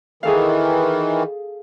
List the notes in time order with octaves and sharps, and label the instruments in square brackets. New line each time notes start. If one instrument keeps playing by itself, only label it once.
[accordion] D#3 E3 [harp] G#4 A4 F5